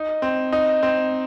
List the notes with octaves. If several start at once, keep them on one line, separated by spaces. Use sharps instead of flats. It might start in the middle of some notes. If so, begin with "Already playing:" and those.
Already playing: D#4
C4
D#4
C4